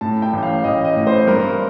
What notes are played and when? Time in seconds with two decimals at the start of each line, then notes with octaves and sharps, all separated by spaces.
0.01 A2 A5
0.22 G5
0.33 A1
0.43 F5
0.64 A1 D#5
0.85 D#5
0.96 A2
1.07 C5
1.27 G2 A#4